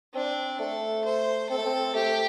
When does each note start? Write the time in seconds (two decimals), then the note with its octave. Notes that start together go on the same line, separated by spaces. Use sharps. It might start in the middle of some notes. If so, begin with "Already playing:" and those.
0.14 C4 D4
0.60 A3 A4
1.05 C5
1.49 C4 A4
1.58 A3
1.66 C4
1.95 A3 G4